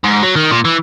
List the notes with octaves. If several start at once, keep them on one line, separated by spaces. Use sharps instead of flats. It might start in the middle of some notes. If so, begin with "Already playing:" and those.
G#2
F#3
D#3
A#2
E3